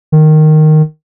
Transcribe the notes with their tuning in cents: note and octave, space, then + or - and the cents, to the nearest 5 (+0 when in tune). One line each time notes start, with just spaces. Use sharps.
D#3 -10